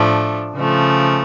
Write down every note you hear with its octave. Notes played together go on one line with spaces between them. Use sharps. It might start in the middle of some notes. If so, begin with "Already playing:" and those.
Already playing: A2 F3 A3 D4
C#3 F3 A3